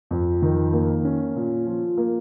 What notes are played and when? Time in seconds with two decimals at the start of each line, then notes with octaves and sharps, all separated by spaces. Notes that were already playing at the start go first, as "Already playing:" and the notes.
0.11 F2
0.42 D#3
0.73 A#3
1.05 C#4
1.36 A#2
1.66 F3
1.97 A#3